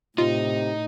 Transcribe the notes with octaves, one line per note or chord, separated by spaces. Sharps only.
A2 C3 D#4 F4